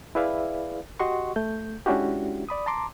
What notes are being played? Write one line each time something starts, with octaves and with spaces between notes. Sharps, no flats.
E4 G#4 B4 D5 E5 F5
F#4 G4 D#5 F#5 C6 C#6
A3 G6
G#3 C#4 D4 E4 F#4 G4
D5 B5 D#6
A5 A#5 C6 D6